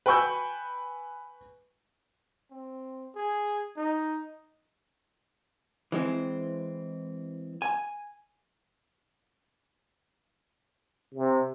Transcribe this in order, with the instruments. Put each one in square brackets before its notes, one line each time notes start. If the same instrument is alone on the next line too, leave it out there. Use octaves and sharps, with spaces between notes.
[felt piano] B4 G5 G#5 C#6 E6 G6
[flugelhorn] C4
G#4
D#4
[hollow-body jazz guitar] E3 G#3 C4
G#5
[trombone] C3